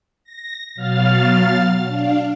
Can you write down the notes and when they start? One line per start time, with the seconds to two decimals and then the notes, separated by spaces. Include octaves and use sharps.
0.24 A#6
0.75 B2 F#3 F5 F6 A6
1.88 D4 F5